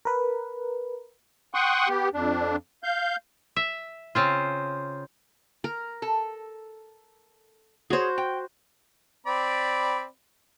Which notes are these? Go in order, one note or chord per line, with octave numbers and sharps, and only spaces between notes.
A#4 B4
F#5 G5 C6 C#6 D#6 F#6
B3 G4
F2 D4
F5 G6
E5
C#3 C4 F4
A#4
A4
F#4 G#4 C5 C#5
G5
C4 D5 B5